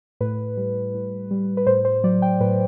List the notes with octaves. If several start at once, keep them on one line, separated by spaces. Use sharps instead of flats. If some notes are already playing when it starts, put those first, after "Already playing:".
A2 B4
G3
A2
G3
B4
A2 C5
C5
F#3 D5
G5
A2 B4